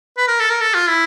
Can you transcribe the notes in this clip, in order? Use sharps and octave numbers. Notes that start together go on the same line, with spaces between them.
B4
A#4
A4
A#4
A4
F4
E4